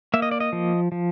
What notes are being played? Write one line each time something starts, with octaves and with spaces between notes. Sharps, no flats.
A#3 E5
D#5
D5
D#5
F3
F3